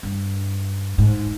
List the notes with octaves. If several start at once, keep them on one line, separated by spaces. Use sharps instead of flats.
G2
G#2